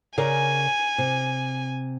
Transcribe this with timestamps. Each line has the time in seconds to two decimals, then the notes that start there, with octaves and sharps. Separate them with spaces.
0.18 C#3 A#4 D5 G#5
0.98 C3